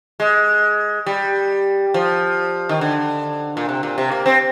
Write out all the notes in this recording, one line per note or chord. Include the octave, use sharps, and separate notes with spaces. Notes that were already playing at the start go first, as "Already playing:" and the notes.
G#3
G3
F3
D#3
D3
A#2
C3
A#2
C3
A#3
C4